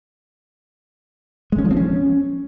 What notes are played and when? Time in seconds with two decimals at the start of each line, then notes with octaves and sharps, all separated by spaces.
1.52 G#3
1.58 C#4
1.65 F3
1.71 C4
1.77 C#4